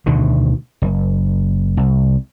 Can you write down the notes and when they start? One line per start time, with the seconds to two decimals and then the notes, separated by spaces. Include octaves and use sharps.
0.06 D2 B2 D3 D#3
0.82 F#1
1.77 C2